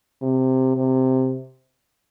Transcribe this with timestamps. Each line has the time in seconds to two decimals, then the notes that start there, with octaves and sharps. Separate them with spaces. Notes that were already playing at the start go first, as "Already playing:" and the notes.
0.22 C3
0.77 C3